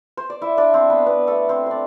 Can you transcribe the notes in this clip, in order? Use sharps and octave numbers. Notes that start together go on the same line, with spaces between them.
C5
D5
E4 E5
D4 D5
C4 C5
B3 B4
B3 B4
A3 A4
C4 C5
D4 C5 D5